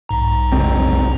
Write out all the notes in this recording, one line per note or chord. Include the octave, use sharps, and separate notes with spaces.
B1 G#2 A#5
F1 C#2 C4